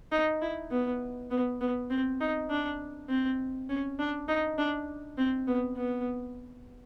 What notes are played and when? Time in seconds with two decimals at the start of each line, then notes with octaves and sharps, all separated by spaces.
0.12 D#4
0.42 E4
0.71 B3
1.31 B3
1.61 B3
1.90 C4
2.21 D#4
2.50 D4
3.09 C4
3.69 C#4
3.99 D4
4.28 D#4
4.58 D4
5.18 C4
5.47 B3
5.77 B3